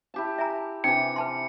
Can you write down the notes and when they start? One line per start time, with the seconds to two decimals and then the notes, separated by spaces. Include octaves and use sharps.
0.14 E4 G4 A5
0.38 E5 G#5 A#5
0.84 C3 E3 D4 D#4 G5 C#7
1.16 B4 A5 C6